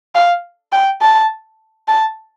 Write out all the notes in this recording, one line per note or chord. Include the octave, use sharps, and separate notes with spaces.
F5
G5
A5
A5